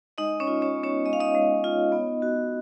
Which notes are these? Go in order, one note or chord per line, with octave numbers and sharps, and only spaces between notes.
G#3 D#4 D#5
C#4 C#5
F4
C#4 C#5
B3
C#4 C#5
G#3 D#5
F5
D#4 D#5
G#3
F4
B3
F#4